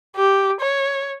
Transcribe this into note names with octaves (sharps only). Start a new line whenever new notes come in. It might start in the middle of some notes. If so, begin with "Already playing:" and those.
G4
C#5